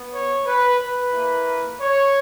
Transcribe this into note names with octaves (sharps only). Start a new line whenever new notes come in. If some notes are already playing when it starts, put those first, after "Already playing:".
Already playing: B3
C#5
B4
B4
A#3 E4
C#5